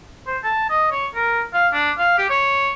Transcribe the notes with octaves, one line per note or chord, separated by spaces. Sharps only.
C5
A5
D#5
C#5
A#4
F5
D4
F5
G4
C#5